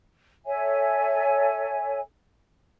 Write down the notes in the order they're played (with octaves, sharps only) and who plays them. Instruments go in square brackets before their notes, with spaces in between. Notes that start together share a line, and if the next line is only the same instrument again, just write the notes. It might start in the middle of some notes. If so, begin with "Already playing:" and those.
[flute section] A4 C#5 E5 G#5